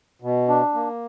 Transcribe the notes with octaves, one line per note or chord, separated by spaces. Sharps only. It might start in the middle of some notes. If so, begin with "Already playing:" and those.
B2
D4
A#3